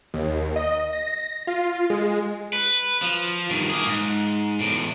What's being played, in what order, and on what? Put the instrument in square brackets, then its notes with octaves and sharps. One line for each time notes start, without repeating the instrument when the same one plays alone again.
[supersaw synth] D#2
D#5
A#6
F4
G#3
[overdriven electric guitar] B4
F3
G2 D#3
A#3 G#4
G#2
E2 A2